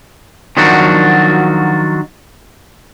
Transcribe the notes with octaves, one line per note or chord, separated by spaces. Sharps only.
D#3 F3 F#3 D4 F#4